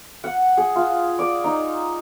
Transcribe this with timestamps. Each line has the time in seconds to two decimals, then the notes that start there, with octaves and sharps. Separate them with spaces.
0.24 F#5
0.57 G#4
0.75 F4
1.19 D5
1.44 D#4